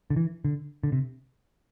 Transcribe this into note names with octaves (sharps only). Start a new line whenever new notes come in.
D3
E3
D3
D3
C3